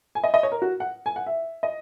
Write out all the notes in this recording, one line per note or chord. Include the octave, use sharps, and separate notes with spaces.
G#5
D#5
D#5
C#5
A#4
F#4
F#5
G#5
F#5
E5
D#5